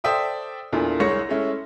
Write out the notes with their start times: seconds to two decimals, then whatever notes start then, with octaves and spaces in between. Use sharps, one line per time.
0.04 A4 C5 D5 E5 G5 D#6
0.72 E2 A#2 A3 D4
1.00 C2 G#3 C#5 A#6 C#7
1.29 G#3 A3 C#4 E4